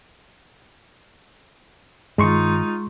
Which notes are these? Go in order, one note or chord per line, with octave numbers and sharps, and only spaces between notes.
G2 D#3 G#3 D#4 F4 C6 C#6